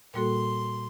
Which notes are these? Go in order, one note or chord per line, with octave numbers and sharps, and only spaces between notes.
A#2 G3 A#3 F#4 A4 C6